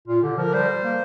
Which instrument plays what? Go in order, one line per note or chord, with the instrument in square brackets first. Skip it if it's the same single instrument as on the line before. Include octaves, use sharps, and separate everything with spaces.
[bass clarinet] A#2 [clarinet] F4
[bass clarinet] D3 [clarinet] G4
[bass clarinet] F3 [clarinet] A#4
[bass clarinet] G3 [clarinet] C5
[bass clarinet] A#3